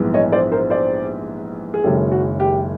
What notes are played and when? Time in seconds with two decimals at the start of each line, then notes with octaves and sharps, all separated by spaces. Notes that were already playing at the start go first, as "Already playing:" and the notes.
Already playing: A#1 G#2 E3 G3 B3
0.14 C#5 D#5
0.32 C5 D5
0.52 A#4 C5
0.70 C5 D5
1.74 G#4
1.84 F#1 F#2 D#3 G#3 C#4 G4 A4
2.12 F#4
2.40 G4